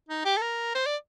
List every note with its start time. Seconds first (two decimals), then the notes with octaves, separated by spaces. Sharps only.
0.09 D#4
0.25 G4
0.37 A4
0.42 A#4
0.75 C5
0.86 D5